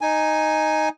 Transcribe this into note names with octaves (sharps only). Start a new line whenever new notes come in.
D#4 G#5